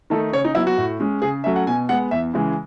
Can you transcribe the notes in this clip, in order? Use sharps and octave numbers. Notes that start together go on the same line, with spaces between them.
D#3 A3 D#4 A4
C#3 C#5
D#4
F#3 B3 E4
F#4
A2
G#3 C#4
C#3 G#4
F#3 A3 C#4 E5
F#5
B2 G#5
G#3 B3 F#5
E2 E5
C#3 E3 G#3